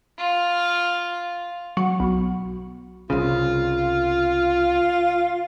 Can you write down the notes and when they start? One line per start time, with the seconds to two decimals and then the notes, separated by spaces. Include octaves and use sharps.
0.18 F4 F5
1.77 F#3
2.00 B1
3.10 C2 C#3 F4